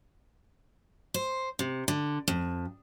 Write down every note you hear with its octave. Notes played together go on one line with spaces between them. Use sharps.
C5
C3
D3
F2